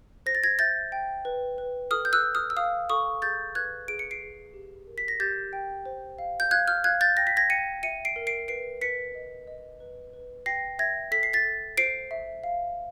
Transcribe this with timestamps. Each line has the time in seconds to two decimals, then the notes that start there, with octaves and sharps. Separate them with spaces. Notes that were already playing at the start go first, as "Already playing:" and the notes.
0.26 C5 A#6
0.35 A6
0.43 G#6 A#6
0.59 E5 G6 A6
0.92 G5
1.25 B4
1.58 B4
1.91 A4 D#6 F6
2.05 G6
2.13 E6 F#6
2.24 A4
2.35 D#6 F6
2.50 E6
2.56 F5 D#6 F6
2.89 A4 C#6 D#6
3.22 G#4 G6 A6
3.55 B4 F#6 G#6
3.88 G#4 D7
3.99 C#7
4.11 C7 D7
4.21 G#4
4.54 G4
4.87 A#4
4.98 B6
5.08 A#6
5.20 G4 G6 A6
5.53 G5
5.86 C5
6.19 F5
6.40 G6
6.51 F5 F#6 G#6
6.68 F6 G6
6.84 F5 F#6 G#6
7.01 G6 A6
7.17 G5 A#6
7.27 B6
7.37 G#6 A#6
7.50 G5 C#7 D#7
7.83 E5 C#7 D#7
8.05 C7 D7
8.16 A#4
8.27 C7 D7
8.48 B4 C7 D7
8.81 B4 B6 C#7
9.15 D#5
9.47 D#5
9.80 B4
10.13 B4
10.46 G5 A#6 C7
10.79 E5 G#6 A#6
11.11 A4 B6
11.23 C7
11.33 A6 B6
11.45 A4
11.77 C5 C7 D7
12.11 E5
12.44 F5